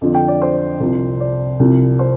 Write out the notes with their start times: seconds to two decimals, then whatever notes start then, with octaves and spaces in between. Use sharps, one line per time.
0.01 F2 D3 F3
0.14 G5
0.28 D5
0.42 C5
0.80 C2 C3 F3
1.20 D5
1.59 C2 C3 F3
1.99 C5